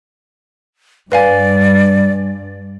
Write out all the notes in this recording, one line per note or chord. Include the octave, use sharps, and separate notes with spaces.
G2 B4 D5 F5 G#5